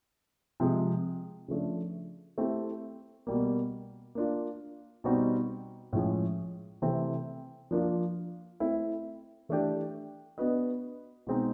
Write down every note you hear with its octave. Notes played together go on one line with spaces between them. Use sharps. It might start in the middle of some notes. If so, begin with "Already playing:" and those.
C3 F3 G#3
C#3 F3 A3 D4
A3 C4 E4 G4
B2 G3 A#3
A#3 D4 F4
B2 G3 C4 D#4 F#4
A2 F3 G#3 C#4
C3 E3 A3 C4
F3 A#3 D4 F4 A#4
A3 C4 E4
E3 A3 D4 G4
B3 D4 F#4 B4 D#5
B2 G#3 C4 D#4